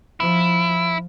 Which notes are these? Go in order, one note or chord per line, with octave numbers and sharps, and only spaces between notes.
F3 E4